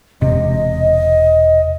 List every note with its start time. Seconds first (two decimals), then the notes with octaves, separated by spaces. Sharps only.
0.21 E1 C3 D#5